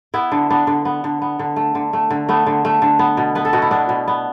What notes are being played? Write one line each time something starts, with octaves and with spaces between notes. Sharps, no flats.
B3 E4
D3
B3 D4
D3
B3
D3
B3
D3
A3
D3
A3
D3
A3 B3
D3
A3
D3
B3
B2
B3 B4
A4
B2 F#4
E4
B3 D4
B2
B3